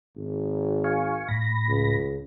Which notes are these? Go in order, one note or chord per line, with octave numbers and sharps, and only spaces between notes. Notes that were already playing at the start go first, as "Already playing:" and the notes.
G#1
F5 G#5 C#6
A2 B5 A#6
C#2